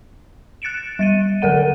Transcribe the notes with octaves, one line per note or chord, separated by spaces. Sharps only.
F#6 A6 C#7 D7 E7
G3 A6 D#7
D3 A4 A#4 F#5 D#7